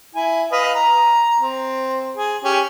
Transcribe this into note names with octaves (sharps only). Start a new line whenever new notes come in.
E4 G#5
B4 D#5 F5
A#5
C4
G#4
C#4 G4